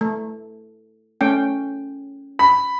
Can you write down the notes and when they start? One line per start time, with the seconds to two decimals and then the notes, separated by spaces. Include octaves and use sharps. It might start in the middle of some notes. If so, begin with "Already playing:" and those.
0.01 A3
1.21 A3 C#4 G5
2.39 B5